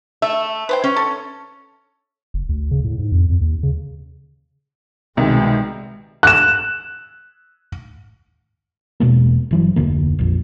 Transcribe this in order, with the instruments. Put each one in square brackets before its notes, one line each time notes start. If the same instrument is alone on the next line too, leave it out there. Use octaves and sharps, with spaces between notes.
[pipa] A3 [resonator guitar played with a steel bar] E5
[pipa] B4 C5 G5
[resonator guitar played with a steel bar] C#4
[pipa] A4
[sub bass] F#1
D2
C#3
A2
G#2
F2
F2
D#2
C#3
[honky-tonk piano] C2 D#3 [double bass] B2 G#3
[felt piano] F#6 E7
[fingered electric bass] E1 B2 G#3 A#3
G1 E3 F#3
F1 D2 D3 A#3
A#1 F2